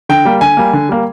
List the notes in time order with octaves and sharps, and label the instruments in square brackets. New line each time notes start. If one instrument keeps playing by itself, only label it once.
[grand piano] D3 G5
G3 A#3
D3 G#5
G3 A#3
D3
G3 A#3